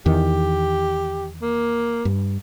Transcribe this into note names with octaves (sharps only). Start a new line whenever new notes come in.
E2 D#3 G4
A#3
G2